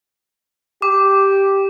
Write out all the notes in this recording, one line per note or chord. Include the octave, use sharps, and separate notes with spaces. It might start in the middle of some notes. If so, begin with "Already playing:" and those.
G4 D6